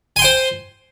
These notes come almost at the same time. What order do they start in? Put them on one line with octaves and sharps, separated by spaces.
G#5 C6 G5 C5